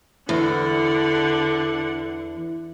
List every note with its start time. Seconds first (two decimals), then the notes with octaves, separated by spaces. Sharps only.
0.29 E2 D3 F#5